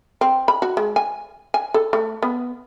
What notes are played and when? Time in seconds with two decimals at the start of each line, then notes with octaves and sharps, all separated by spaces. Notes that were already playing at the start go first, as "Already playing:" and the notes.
0.21 C4
0.48 B5
0.62 F#4
0.77 G#3
0.96 G#5
1.54 G#5
1.74 A4
1.93 A3
2.23 B3